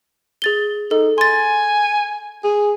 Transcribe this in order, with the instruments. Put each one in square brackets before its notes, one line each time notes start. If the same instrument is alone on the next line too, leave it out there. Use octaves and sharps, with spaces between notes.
[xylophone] G#4 A6 G7
[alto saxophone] D#4 [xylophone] A4
[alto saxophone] G#5 [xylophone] C6 A6
[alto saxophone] G#4